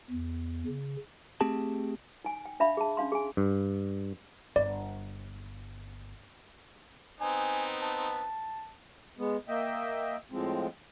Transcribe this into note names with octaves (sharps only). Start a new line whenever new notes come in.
E2
C#3
A3 C4 G4 G#4 A5
D#4 G#5
G5
D4 E5 F5 B5
G#4 A5
C#4 D4 F5 C6
G#4 G#5
G2
G1 D5
B3 C4 D#4 G#5
A5
G#3 B3
A#3 D#5 E5 G5
A2 F3 G#3 C4